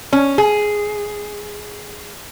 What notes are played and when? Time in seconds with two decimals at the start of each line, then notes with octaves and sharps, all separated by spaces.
0.13 C#4
0.38 G#4